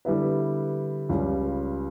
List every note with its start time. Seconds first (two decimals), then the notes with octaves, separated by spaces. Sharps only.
0.05 D3 G3 B3 E4 B4
1.09 C#2 C#3 G3